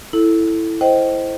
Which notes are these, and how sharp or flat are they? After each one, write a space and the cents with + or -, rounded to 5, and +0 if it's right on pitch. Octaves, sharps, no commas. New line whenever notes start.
E4 +0 A4 +0
C5 +0 D#5 +0 G5 -20